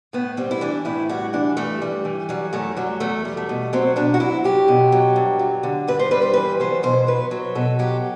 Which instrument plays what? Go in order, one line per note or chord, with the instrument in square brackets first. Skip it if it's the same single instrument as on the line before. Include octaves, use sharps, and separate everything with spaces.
[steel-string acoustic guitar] A2 B3
G3 C4
E4
E3 D4
A2 E4
G3 F#4
E3 D4
G2 A3
G3
E3
F#3 G3
F#2 A3
F#3 G3
E2 A3
G3
A3
B2
F#3 C4
B2 D4
F#4
F#3 E4
F#3 G4
B2
F#3
G2
F#3
D3
G2 B4
C5
G3 B4
C5
E3 B4
F#3 C5
B2 C5
F#3 B4
F#3
B2 A4
F#3 G4